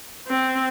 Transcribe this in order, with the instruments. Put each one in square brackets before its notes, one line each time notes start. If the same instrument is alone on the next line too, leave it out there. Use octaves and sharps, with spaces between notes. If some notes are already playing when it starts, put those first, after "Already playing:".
[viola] C4